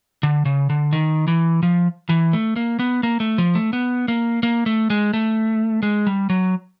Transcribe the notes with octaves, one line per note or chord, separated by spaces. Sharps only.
D3
C#3
D3
D#3
E3
F3
E3
A3
A#3
B3
A#3
A3
F3
A3
B3
A#3
A#3
A3
G#3
A3
G#3
G3
F#3